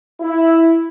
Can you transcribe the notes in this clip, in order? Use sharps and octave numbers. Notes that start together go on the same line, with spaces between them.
E4